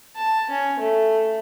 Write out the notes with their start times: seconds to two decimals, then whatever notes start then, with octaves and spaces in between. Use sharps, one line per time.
0.16 A5
0.50 C#4
0.79 A3